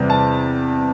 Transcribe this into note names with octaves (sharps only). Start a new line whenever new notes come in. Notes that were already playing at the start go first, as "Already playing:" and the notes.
Already playing: E2 C3 G3
A5